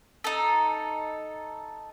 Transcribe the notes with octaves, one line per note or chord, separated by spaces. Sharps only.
D#4 A4